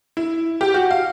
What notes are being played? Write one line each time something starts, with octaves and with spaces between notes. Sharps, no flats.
E4
G4
F#4
F5